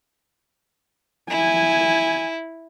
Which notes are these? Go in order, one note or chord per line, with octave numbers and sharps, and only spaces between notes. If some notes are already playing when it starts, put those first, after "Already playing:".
E4 G#5